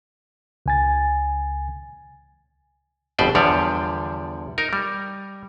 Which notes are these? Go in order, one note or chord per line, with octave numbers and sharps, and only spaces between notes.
C#2 G#5 A6
G1 F2 B2 B4 C5 D5
E2 D3 F3 G3 C#5 D5
D#4 A#4
G3